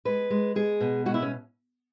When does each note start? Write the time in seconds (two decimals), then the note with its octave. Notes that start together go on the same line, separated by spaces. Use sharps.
0.05 G#3 B4
0.30 G#3
0.55 G#3 G#4
0.80 B2
1.06 G#3 F#4
1.14 E4
1.22 C#4